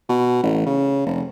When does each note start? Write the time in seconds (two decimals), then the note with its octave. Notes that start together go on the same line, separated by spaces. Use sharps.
0.09 B2
0.43 A1
0.66 C#3
1.06 F1